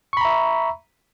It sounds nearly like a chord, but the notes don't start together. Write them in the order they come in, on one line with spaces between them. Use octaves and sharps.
C#6 B5 A#5 E5